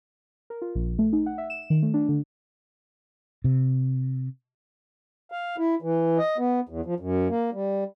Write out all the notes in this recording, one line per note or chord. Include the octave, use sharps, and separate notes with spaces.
A#4
F4
A#1
A3
D#4
F#5
E5
E7
D#3
A3
D4
D3
C3
F5
E4
E3
D#5
B3
E2
F3
F#2
A#3
G3